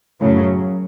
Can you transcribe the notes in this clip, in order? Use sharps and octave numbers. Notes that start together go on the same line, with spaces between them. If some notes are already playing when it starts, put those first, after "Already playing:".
F#2 A2 C#3 F#3